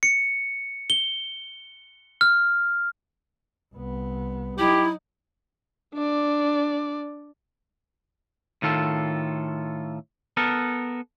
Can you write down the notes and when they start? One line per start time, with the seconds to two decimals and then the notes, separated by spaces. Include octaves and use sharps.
0.03 C#7
0.90 G7
2.21 F6
3.74 C2 B3
4.58 F#3 D#4 E4 G4
5.94 D4 D5
8.62 A2 D#3 F4 A4
10.37 B3 A4 A#4